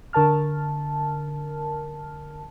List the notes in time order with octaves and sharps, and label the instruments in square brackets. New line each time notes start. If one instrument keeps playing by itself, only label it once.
[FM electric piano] D3 A#4 A5 F6